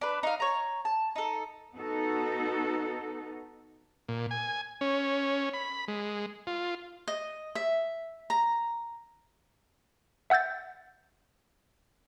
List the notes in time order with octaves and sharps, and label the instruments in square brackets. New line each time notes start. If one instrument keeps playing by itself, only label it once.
[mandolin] D4 B4
D#4 F5
C#5 A#5
A5
D#4 A4
[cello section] B3 D#4 F#4 A4
[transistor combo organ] A#2
G#5
C#4
B5
G#3
F4
[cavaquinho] D#5
E5
A#5
[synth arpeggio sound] E5 F#5 E6 G6 A6